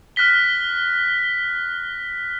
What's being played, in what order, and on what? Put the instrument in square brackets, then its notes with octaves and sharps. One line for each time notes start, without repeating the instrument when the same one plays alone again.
[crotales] F6 F#6 A#6 B6 G7